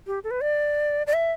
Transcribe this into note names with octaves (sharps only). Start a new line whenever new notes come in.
G4
A4
B4
D5
D5
E5